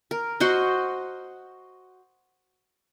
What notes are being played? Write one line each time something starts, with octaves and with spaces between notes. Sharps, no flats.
A#4
F#4 C5 D#5